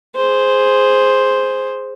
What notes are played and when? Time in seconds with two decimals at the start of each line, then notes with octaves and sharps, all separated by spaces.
0.16 G#4 C5